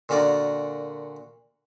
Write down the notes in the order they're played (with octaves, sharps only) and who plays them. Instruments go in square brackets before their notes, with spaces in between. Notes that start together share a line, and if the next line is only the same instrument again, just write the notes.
[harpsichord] A#2 D3 F#4 A#4 D5 D6